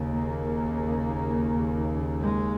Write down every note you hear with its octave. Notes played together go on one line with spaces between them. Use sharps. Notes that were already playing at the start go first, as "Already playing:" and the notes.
Already playing: D#2 C#3
A#3
G#3